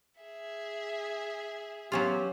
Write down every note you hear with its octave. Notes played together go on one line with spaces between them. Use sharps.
G#4 E5
F#3 B3 C#4 F4 G4